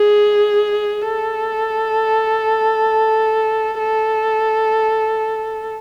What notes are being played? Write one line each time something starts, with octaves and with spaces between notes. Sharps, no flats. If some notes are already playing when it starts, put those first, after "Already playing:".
Already playing: G#4
A4
A4